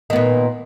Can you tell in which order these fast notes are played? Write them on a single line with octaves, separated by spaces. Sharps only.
D#3 B3 A#2